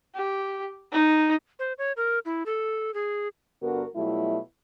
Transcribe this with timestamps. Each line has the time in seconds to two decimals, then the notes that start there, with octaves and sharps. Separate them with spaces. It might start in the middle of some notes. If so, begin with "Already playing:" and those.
0.15 G4
0.92 D#4
1.59 C5
1.78 C#5
1.97 A#4
2.25 E4
2.46 A4
2.94 G#4
3.62 G2 D3 B3 F#4 A#4
3.95 B2 F#3 G3 A3 E4 F4